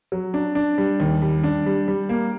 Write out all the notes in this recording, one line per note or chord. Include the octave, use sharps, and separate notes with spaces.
F#3
D4
D4
G3
D#2
G3
D4
G3
G3
A#3